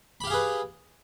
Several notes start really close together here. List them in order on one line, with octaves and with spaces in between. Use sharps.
B5 G4 F5 G#4 B4